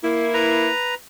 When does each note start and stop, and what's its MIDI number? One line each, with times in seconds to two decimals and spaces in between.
0.03 0.68 58
0.03 0.68 64
0.34 0.95 71
0.34 0.95 82